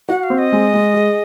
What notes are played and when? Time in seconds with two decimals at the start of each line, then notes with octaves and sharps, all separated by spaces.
0.09 F#4 F#5
0.23 F5
0.30 C4
0.38 D#5
0.52 G#3
0.74 G#3
0.94 G#4